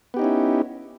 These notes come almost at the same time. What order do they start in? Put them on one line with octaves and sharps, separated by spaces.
B3 G4 D#4 C#4 E4